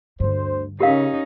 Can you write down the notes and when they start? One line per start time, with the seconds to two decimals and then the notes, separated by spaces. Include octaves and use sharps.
0.20 D2 G2 D3 C5
0.80 C#3 C#4 D#4 G4 A#4 F5